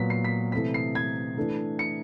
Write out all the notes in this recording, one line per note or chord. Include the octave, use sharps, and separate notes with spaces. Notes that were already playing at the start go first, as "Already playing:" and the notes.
Already playing: A#2 F#3 B3 B6
C7
B6
C3 E3 A3 B6
C7
G#6
E3 A3 D4
C#7